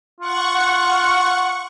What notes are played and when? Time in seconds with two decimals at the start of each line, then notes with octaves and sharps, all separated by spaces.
0.21 F4 F#5 C#6